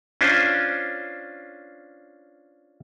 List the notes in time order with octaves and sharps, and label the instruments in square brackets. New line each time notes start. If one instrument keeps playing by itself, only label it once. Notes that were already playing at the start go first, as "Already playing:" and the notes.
[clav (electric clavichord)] C#4 D4 F4 C5